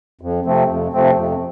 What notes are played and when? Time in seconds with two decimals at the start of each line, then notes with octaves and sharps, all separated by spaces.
0.21 F2
0.45 C3 F3 A3 C4
0.69 F2
0.93 C3 F3 A3 C4
1.16 F2